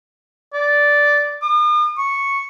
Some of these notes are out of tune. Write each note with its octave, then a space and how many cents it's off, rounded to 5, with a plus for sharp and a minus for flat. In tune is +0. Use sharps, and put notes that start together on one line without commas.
D5 -10
D#6 -45
C#6 -5